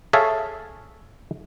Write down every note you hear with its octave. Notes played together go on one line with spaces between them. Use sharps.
G#4 A4 C#5 E5 F5 A5